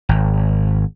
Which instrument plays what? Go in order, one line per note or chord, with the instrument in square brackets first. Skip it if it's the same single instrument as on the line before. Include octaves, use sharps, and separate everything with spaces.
[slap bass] G#1